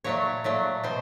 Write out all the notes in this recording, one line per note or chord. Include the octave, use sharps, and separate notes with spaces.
A#2 F#3 A3 C#5
A#2 F#3 A3
B2 C5